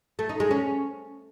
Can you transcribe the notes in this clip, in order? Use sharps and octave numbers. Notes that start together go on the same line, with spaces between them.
A3
D#4
G#3
C#4